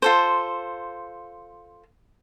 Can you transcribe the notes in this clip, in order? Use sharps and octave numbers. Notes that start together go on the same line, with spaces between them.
F4 A4 C5